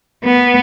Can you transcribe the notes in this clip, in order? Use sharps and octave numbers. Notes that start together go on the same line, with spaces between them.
B3